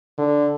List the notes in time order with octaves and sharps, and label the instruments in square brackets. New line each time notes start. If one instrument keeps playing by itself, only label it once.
[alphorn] D3